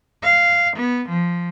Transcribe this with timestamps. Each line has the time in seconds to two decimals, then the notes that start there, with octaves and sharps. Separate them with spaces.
0.23 F5
0.76 B3
1.09 F3